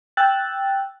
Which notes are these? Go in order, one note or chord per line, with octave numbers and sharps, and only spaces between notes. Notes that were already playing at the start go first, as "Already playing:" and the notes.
G5 E6 F#6 A6